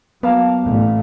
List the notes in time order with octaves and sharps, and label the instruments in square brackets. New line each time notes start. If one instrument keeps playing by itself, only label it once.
[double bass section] F#3 [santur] A#3 F5 A5 [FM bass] B3
[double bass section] A1 A3